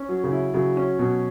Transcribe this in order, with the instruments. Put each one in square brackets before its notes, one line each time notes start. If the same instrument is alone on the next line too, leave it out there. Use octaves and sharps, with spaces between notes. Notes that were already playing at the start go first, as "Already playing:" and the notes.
Already playing: [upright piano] C#4
F#3
[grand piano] C#3
[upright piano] E4
[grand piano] C#3 [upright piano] F#3
[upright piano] C#4
[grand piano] B2 [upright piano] F#3